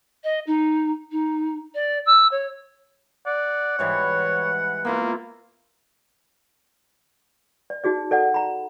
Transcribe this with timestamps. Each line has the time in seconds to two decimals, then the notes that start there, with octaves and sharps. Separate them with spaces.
0.24 D#5
0.47 D#4
1.12 D#4
1.75 D5
2.06 E6
2.31 C#5
3.26 D5 F#5
3.79 G#2 E3 G3 C#5
4.85 A#3 B3 E4 F4
7.70 D5
7.84 D#4 F#4 G#4 D5
8.11 A4 D5 F#5
8.34 A#5 B5